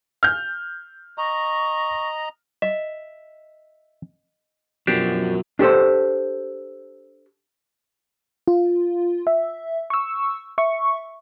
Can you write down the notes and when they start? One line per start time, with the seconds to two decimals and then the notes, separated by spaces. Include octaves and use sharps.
0.23 F6 G6
1.18 D#5 A#5 C#6
2.62 D#5 E5
4.87 B2 F3 F#3 D4 G4 A#4 C5
5.59 D4 G4 A4 C5
8.48 F4
9.27 E5
9.90 C#6 E6
10.58 E5 C#6